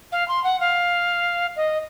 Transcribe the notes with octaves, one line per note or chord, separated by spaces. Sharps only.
F5
C6
F#5
F5
D#5